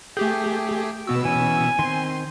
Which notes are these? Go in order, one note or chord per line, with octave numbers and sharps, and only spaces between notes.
A3 G4 G#4 G5
B2 B3 F#4 E6
E3 C#4 G#5
D#3 C4 C6